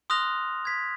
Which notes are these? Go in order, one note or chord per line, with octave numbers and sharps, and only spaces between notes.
C6 D#6 F6 F#6 A#6 F7
G#6 B6